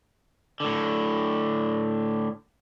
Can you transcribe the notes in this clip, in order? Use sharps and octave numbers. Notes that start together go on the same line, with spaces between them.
A2 D3